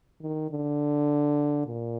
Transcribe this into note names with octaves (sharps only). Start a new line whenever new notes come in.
D#3
D3
A#2